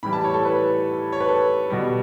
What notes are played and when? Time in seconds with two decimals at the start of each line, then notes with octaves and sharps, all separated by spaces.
0.03 A2 E3 G3 B5
0.13 A5
0.24 C#5
0.34 A4
0.45 B4
1.13 C#5
1.20 B4
1.29 A4
1.70 B2 G3